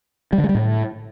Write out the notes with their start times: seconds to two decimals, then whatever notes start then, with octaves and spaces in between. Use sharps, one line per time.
0.33 G3
0.38 D3
0.44 G#3
0.49 G3
0.55 A2